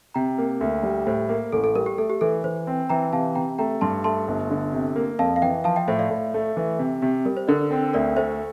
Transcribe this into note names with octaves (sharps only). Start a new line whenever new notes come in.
C3 G5 A#5
A#3
D2
G3
A2 C5
A#3
A1 A4
A4
G3 A#4
G4
A3 A4
G4
E3 A4
E3 C5
C4
E3 G5 A#5
C3 F5 A5
C3 G5 A#5
A3 G5 A#5
G2 A5 C6
A3 A5 C6
G1
D3
C3
A#3
F2 F5 A5
F5
E3 E5 G5
F3 F5 A5
E5 G5
A2 C5 E5
D5 F5
A2
A3
E3
C3
C3 G4
G3 A#4
C5
D3 A#4 D5
C4
D2 A#4 D5
A3 C5 E5